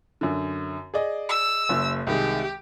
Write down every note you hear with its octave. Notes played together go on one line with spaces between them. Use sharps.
F#2 D3
G#4 D5 D#5
E6
F#1 F#2
C2 D#3 G#3 G4